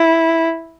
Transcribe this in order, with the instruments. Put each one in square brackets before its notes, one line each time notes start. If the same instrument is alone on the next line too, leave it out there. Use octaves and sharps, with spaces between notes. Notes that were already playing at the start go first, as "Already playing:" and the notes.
Already playing: [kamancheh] E4